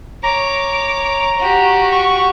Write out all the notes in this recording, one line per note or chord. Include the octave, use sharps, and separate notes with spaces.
C#5 A#5 D6
F#4 G4
C#6